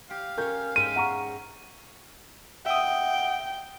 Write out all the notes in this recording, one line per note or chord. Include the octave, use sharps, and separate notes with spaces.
G4 F5
C#4 A#4 C#5 G6
G#2 E5 G5 D#7
F#5 A#5 C#6
E5 F#5 G5 D#6